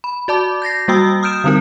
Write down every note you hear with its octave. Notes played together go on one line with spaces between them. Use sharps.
B5
F#4 D5 A5 D6
G6 A6 A#6 C7
G3 A#3 F#4 G5 D#6 E6
D#6 F6 G6 D7 E7
D3 G3 C4 D#4 A#4